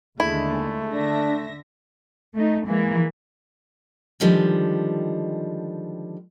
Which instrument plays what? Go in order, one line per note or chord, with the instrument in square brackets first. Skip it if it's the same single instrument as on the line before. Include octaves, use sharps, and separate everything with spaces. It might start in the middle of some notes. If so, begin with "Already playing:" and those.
[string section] D#2 D3 G#3 [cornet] A3 [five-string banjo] E4
[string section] D3 E5 A#6 [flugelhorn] D4
[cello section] A3 D#4
E3 G#3 A#3
[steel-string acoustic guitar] D3 D#3 F3 G3 G#3